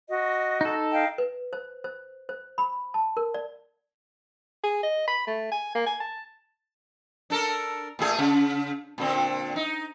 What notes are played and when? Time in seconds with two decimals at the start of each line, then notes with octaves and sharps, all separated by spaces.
0.09 F#4 D#5
0.61 D#4 A4
0.91 D#5 F5 G5
1.18 B4
1.53 C5
1.84 C5
2.29 C5
2.58 B5
2.94 A5
3.17 A#4
3.34 D5
4.64 G#4
4.83 D#5
5.08 B5
5.27 A3
5.52 G#5
5.75 A#3
5.86 G#5
6.00 A5
7.30 D4 A4 A#4
7.99 A#2 A3 G#4
8.19 C#3
8.98 A#2 D3 C4
9.56 D#4